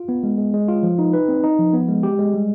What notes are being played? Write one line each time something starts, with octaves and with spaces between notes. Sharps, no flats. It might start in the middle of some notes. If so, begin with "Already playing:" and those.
Already playing: F4
B3
G#3
G#3
G#3
F4
F3
D#4
B4
C4
D#4
F3
B3
G#3
G4
G#3
G3